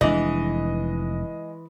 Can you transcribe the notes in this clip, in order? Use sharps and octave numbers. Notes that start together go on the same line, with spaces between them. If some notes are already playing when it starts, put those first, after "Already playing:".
F1 G#2 E3 G#3 D4 D#5